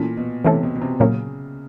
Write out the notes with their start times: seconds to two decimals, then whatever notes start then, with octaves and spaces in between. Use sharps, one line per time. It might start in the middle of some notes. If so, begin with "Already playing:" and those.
Already playing: A#2 E3 A3 C#4 E4 A4
0.17 B2
0.45 C3 E3 A3 C#4 E4 A4
0.63 B2
0.75 B2
0.82 C3
1.00 A#2 C#3 F#3 A#3 C#4